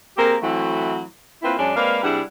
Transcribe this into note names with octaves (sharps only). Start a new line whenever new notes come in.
A#3 C4 G4 G#4 A#4
E3 F#3 A3 C4 E4 F#4
A#3 C4 E4 F4 B4
F#2 G#3 C#4 D4
G#3 A#3 C4 B4 D5 F5
C3 G3 D4 E4 G#4 F#5